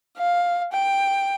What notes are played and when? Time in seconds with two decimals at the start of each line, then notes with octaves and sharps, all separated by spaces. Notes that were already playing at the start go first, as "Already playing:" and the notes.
0.18 F5
0.73 G5